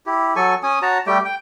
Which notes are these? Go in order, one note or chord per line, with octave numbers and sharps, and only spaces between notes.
E4 G4
F#3 A4 G#5 C#6
C#4 G#5 D#6
F#4 C#5 A5 A#5
G3 A3 G4 G5
G5